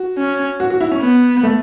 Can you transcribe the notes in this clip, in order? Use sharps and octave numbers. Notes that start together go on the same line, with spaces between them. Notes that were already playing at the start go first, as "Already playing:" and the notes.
Already playing: F#4
C#4
F#4
F#4
E4
C#4
B3
A3